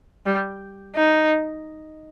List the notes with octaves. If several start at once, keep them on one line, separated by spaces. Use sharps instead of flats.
G3
D#4